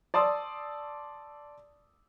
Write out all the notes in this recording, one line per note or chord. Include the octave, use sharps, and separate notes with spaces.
D5 A5 C6 D#6 E6